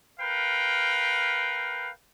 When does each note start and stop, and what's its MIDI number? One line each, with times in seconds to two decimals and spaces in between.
0.20 1.90 70
0.20 1.90 71
0.20 1.90 77
0.20 1.90 79